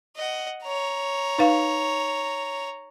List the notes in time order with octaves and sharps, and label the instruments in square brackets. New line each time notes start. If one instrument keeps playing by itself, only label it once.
[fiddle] D#5 F#5
C#5 A#5
[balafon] D#4 B4 F5